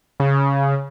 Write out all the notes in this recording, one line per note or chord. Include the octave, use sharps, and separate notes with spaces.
C#3